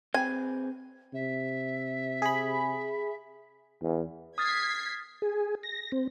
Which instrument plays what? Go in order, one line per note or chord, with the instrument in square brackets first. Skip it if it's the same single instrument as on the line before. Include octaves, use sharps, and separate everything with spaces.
[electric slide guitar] C4 G#4 B4 [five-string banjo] G#5
[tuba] C3 [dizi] E5
[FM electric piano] G#4 B5
[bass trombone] E2
[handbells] D#6 F6 A6 [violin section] G#6 B6 C7
[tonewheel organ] G#4
A#6
C4